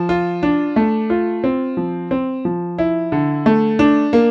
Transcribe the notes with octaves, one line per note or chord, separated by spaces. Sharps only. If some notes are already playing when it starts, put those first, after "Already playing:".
Already playing: F3
F4
D4
A3
F4
C4
F3
C4
F3
E4
D3
A3
D4
A#3